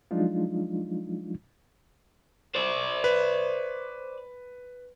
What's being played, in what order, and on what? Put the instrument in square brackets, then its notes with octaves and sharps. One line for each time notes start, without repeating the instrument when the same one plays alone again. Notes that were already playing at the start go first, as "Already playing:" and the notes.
[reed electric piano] F3 F#3 G#3 D4 D#4 F4
[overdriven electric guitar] C5 D5
[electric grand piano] B4